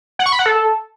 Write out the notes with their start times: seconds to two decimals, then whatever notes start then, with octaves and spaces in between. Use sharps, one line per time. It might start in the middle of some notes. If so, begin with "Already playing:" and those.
0.19 F#5
0.26 C#6
0.32 B5
0.39 F#5
0.46 A4